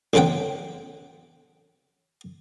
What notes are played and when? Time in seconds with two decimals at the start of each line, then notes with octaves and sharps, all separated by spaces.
0.13 A1 F2 C#3 B3 F#5 G5